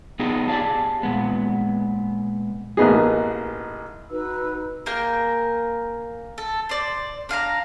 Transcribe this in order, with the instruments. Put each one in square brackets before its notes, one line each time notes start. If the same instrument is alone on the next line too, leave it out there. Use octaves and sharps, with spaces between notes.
[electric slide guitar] B3 D4 D#4 F4 G4 G#4
G4 G#4 D5 F5 A5
A#2 G#3 B3
[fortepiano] A1 A#3 B3 D#4 G#4
[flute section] D#4 F#4 B4 E6
[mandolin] A#3 G#4 A#4 G5
A4
C5 D5
D4 F5 G#5 A#5